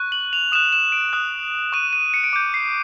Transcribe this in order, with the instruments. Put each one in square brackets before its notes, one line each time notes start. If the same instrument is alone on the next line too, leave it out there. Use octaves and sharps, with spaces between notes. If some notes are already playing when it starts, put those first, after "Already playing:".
Already playing: [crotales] C#6 F#6
F#7
F7
D#6 F#6 E7
E7
D7
D#6 F#6
C#6 F#6 D#7
D#7
C#7
D7
D6 G6 C#7
C7